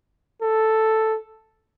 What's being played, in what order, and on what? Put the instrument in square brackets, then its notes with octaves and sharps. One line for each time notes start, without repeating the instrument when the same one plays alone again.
[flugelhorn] A4